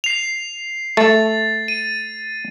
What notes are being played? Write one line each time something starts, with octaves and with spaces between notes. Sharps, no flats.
C7 F7
A3 A6
D#7